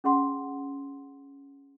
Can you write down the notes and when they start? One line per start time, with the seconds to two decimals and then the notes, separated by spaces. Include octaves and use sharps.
0.04 C#4 G#4 F#5 C6